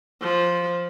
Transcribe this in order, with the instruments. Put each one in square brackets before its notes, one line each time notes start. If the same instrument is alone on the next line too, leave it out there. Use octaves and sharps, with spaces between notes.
[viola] F3